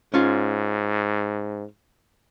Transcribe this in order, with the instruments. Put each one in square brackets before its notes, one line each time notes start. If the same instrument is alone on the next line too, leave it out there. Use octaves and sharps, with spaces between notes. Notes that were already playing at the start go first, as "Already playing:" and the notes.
[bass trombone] G#2 [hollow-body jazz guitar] C#4 F4